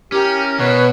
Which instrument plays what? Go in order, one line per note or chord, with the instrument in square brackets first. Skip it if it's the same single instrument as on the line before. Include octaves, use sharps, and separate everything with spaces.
[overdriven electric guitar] C#4 [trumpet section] E4 A#4 [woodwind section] G4
[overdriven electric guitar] B2 [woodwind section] B4 [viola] C#5